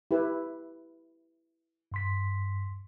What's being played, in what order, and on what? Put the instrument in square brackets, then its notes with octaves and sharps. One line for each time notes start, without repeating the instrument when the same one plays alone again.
[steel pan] E4 G4 B4
[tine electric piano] G2 C6 B6